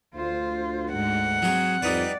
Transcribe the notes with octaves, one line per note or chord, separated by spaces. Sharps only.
D2 F4 C5
G#2 G#3 F#5
F#3 C4 G#4
F2 G3 D#4 B4 D5